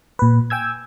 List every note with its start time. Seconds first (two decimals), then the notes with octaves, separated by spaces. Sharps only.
0.19 A#2 B4
0.50 G5 G#5 E6 G#6